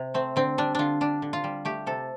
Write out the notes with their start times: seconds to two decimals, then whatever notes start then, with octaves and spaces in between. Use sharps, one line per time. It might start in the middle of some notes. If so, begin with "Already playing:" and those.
Already playing: C3
0.14 A3 C4
0.36 D3 C4
0.58 G3 D4
0.75 D3 D4 F4
1.01 G3 D4
1.22 D3
1.33 F4
1.44 G3
1.65 A3 G4
1.87 C3 A4